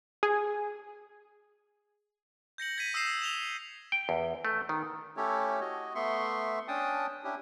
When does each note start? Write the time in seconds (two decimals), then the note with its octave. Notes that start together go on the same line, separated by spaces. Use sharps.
0.23 G#4
2.58 G6 A#6 C#7 F#7
2.78 G#6 B6 D#7
2.94 D#6 E6 G6 A#6 C7 E7
3.22 E7 F7 G7
3.92 G5
4.09 E2
4.45 A3
4.69 D#3
5.17 A3 C#4 E4 G4 A4 C#5
5.61 F#4 D#5
5.95 A3 B3 E5 C6 C#6
6.68 C#4 D4 G5 A5 D#6
7.24 C#4 D4 E4 G4